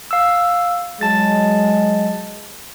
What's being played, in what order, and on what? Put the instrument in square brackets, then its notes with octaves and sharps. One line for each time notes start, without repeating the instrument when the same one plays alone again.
[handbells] F5 E6
[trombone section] F#3 G#3 [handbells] A5 A6